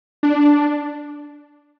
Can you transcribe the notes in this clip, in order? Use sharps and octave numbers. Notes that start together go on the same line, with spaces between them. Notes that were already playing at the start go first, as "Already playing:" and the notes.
D4